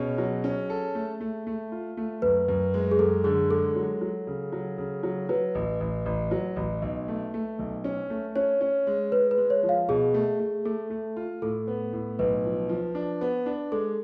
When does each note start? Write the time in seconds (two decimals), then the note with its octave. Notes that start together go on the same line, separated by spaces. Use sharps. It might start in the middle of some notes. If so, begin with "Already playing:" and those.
Already playing: B2 C#4 G#4
0.18 F#3
0.44 C#4
0.70 A4
0.95 A3
1.21 A3
1.47 A3
1.72 F4
1.97 A3
2.22 F#2 B4
2.48 F#2
2.74 G#3
2.91 G#4
2.99 F#2 A4
3.24 D3 G#4
3.50 G#3 A4
3.76 F#3
4.01 F#3
4.27 C#3
4.52 F#3
4.78 C#3
5.03 F#3
5.29 F#3 B4
5.55 A1
5.80 A1
6.06 A1
6.31 F#3
6.56 A1
6.82 B1
7.08 A3
7.34 A3
7.59 B1
7.84 C#4
8.10 A3
8.36 C#4 C#5
8.61 C#4
8.87 G#3
9.12 G#3 B4
9.31 B4
9.38 G#3
9.50 C#5
9.63 F3
9.69 F5
9.88 B2 G#4
10.14 A3
10.40 A3
10.65 A3 A4
10.90 A3
11.16 F4
11.42 A2 A4
11.68 B3
11.93 A2
12.19 B1 B4
12.45 F3
12.69 F3
12.95 D4
13.21 B3
13.46 D4
13.72 G#3 A4